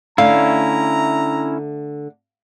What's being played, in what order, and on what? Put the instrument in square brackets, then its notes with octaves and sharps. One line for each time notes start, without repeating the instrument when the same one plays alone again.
[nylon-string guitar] D3 A3 [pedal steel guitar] C#4 E4 [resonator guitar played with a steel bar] F5 [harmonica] A#5